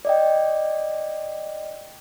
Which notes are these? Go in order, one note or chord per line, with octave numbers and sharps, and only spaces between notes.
D5 D#5 G5